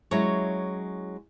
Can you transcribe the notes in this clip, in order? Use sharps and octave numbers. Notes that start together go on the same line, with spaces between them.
F#3 G#3 C#4 E4 C#5